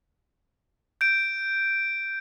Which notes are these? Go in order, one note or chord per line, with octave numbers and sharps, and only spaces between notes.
G6 D7